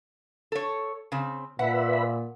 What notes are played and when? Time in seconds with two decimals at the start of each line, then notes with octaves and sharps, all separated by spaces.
0.52 A4 C#5
1.12 C#3 C4
1.59 A#2 B4 E5 F#5 B5